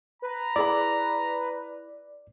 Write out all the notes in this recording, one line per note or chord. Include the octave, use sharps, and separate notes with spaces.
B4 A#5
E4 G#4 D5 B5